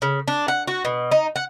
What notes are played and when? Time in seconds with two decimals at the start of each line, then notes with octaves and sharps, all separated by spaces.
0.02 C#3
0.28 D4
0.48 F#5
0.67 F#4
0.85 B2
1.12 D#4
1.36 F#5